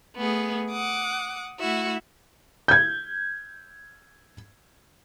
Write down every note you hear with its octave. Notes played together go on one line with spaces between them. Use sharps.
A3 B3 G#4
F#5 D6 D#6
A3 E4 F#4 E5
G6 G#6